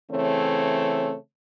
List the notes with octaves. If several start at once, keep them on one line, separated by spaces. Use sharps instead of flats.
C#3 E3 A3 C4 C#5